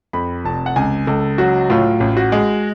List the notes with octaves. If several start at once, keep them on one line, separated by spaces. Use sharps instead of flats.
F2 B5
F1 A5
F#5
C#2 G#5
C#2 A4
F#3 F#4
A2 F4
A1
F#4
G#3